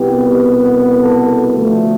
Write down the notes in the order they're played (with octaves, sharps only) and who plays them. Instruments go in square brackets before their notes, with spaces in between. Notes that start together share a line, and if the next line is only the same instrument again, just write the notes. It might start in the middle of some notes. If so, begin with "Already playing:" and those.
Already playing: [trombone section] C2 B2 B3 G4
A4
D2 D3 F3 A3